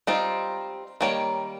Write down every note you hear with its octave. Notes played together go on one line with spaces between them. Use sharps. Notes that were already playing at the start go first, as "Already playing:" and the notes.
G3 C4 D#4 F4
D#3 G3 A#3 C#5